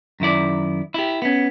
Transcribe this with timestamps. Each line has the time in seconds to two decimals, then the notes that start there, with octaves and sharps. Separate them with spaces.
0.20 F#2 D#3 E4 D5
0.94 E4 G4
1.22 B3 C#4